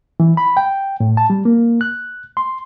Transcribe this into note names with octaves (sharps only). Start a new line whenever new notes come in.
E3
B5
G5
A2
A5
G3
A#3
F#6
C6